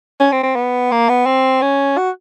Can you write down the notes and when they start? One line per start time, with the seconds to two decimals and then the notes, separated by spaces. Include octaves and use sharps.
0.20 C#4
0.32 C4
0.43 C4
0.55 B3
0.91 A#3
1.09 B3
1.26 C4
1.62 C#4
1.97 F#4